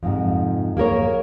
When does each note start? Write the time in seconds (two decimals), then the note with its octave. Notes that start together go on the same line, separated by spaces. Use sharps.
0.03 F2 G#2 C3
0.77 A#3 G#4 A#4 C#5